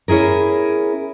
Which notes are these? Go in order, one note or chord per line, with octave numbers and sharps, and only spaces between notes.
C#4 E4 G#4 A#4